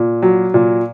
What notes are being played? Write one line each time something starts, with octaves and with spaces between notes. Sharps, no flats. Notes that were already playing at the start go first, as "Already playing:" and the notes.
Already playing: A#2
F#3
A#2